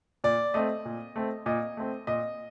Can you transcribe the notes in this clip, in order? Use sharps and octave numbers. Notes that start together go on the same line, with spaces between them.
A#2 D5
A3 C4 D#5
A#2
A3 C4
A#2 D#5
A3 C4
A#2 D#5